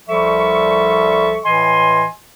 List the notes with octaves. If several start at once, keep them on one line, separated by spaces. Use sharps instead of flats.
C2 F3 G3 A4 E5 C#6
A2 E3 D#5 G#5 C6